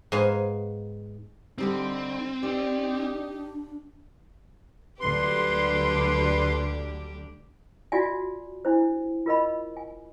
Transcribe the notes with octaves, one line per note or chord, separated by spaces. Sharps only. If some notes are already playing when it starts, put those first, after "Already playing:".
G#2 B3 F5 G#5
D3 G3 C4 D#4
D#4 G4 D5
D4
D2 D3 F#3 G3 D4 G4 B4 C6
F4 F#4 D5 E5 G#5
D4 E4 C5
F4 A#4 D#5 B5
G#5